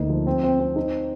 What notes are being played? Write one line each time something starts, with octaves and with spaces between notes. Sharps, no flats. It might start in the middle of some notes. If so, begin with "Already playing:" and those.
Already playing: D2 A#3 D#4
F3
C4
C4
C4
D#4